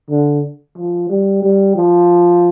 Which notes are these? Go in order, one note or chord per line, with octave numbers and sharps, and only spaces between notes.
D3
F3
G3
G3
F3